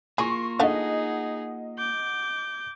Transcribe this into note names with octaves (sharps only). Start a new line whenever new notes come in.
A#3 F4 G#4 A#4 C6 C#6
A3 D4 D#4 G#4 D#5 F5 F#5
D6 G6